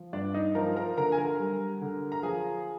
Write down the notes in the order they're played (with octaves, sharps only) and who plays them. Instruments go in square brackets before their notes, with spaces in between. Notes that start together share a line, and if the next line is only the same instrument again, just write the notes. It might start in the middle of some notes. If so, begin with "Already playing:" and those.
Already playing: [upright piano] F3
G2 D4 D5
D#4 D#5
F3 A#4 A#5
A#4 A#5
D3 A#4 A#5
G#5
A#4 A#5
G3
D3
A#5
F3 G#4 G#5